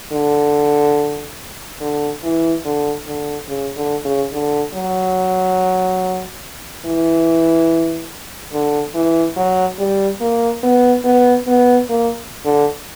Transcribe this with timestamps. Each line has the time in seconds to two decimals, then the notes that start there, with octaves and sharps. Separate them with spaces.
0.13 D3
1.81 D3
2.23 E3
2.65 D3
3.07 D3
3.49 C#3
3.77 D3
4.05 C#3
4.33 D3
4.75 F#3
6.86 E3
8.53 D3
8.95 E3
9.36 F#3
9.79 G3
10.20 A#3
10.63 B3
11.05 B3
11.47 B3
11.89 A#3
12.46 D3